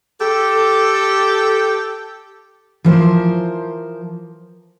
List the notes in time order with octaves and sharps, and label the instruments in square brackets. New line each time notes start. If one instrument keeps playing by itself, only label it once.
[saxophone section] G4 A4
[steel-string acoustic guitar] E3 F3 A#4 C5